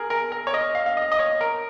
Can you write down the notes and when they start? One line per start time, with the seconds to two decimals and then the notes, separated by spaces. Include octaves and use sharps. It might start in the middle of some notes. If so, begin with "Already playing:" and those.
Already playing: G#4 A#4
0.10 A#4
0.32 A#4
0.47 C#5
0.54 D#5
0.75 F5
0.86 F5
0.97 D#5
1.12 D#5
1.19 C#5
1.41 A#4